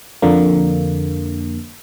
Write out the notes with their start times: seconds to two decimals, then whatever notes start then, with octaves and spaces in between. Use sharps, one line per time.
0.22 F2 D3 A#3